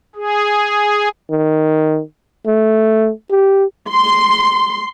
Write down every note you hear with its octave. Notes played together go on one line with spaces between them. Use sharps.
G#4
D#3
A3
G4
C6